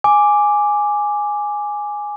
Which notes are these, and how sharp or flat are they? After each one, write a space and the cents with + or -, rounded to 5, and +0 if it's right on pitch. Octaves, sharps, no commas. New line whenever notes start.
G#5 +0 D6 +0